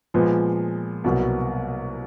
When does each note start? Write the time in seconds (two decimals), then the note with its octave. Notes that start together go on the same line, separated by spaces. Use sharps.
0.14 A#2 F3 G#3 B3
1.04 C2 B2 F#3 A#3